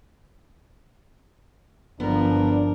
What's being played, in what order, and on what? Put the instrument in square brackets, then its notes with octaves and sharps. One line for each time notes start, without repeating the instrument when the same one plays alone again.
[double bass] G1 F3 [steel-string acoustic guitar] B3 [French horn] D4 [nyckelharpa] A#4